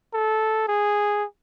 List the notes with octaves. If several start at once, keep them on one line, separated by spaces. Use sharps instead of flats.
A4
G#4